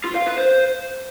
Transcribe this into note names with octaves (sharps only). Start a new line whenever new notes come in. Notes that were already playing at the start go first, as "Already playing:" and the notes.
F4
F5
B4
C5